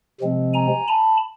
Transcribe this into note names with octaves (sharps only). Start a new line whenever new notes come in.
C3 F3 G#3 C4
G#5 A#5
A5 B5